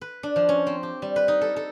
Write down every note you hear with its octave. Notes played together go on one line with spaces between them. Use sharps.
B4
D4
F3
C#4
C4
G4
G3
B4
D#4
A4
A4